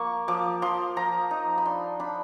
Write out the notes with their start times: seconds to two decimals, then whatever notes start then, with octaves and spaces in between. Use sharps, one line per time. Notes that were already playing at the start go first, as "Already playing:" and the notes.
Already playing: F3 A#3 C#6
0.28 F3 D6
0.62 F3 C6
0.96 F3 A#5
1.31 D#4
1.58 B5
1.65 D4 C6
2.00 D4 B5